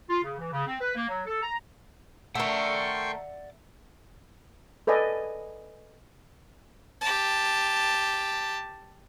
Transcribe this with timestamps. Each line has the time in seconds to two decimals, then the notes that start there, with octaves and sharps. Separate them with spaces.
0.10 F4
0.23 C#3
0.38 E3
0.51 C#3
0.67 C4
0.81 B4
0.95 A#3
1.08 F#3
1.26 A4
1.43 A#5
2.35 A3 A#4 D5 E5 F#5 G5 C6 C#6
4.87 A4 B4 D5 D#5 G#5
7.01 G4 A5